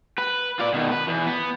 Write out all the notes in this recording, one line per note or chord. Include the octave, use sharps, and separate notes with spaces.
B4
F4 D5
B2 D#3
B4
E2
B3